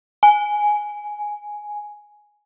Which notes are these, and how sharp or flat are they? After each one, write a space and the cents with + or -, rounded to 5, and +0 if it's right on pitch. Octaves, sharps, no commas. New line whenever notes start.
G#5 +5